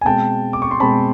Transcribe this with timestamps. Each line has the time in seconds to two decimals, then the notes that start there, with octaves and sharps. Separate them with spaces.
0.01 G#5
0.05 B2 G#3 C4 G5 A5
0.53 D6
0.62 C#6
0.71 C6
0.80 B2 G#3 C4 A5 B5